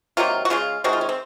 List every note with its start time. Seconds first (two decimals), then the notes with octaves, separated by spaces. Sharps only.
0.17 C3 D#3 F#3 A#3 F4
0.45 F#4
0.50 C#3 G#3 F4
0.84 C3 D#3 G#3 F#4
0.93 F4
1.01 C#4
1.09 C4